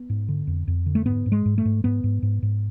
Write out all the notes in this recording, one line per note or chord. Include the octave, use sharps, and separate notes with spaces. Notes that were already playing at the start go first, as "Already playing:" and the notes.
Already playing: B3
G#2
D3
F2
F2
D3
A3
G#2 B3
G#2
G#3
G#2
A3
G#2
G#2 B3
G#2
G#2
G#2